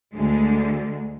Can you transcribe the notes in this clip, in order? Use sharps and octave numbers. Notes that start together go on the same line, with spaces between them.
D2 D3 G#3